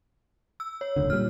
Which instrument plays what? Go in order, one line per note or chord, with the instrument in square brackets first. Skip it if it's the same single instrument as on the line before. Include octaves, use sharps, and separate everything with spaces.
[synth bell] E6
C#5
[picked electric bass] D#1 C#2 D3
[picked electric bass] A#2 G3 [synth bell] F6